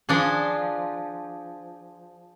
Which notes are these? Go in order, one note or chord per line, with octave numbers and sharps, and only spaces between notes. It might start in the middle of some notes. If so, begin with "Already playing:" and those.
F3 D4 G#4